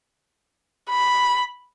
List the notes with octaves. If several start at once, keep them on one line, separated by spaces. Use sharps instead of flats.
B5